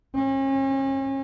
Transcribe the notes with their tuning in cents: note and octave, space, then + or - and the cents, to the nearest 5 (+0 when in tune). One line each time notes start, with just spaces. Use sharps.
C#4 -40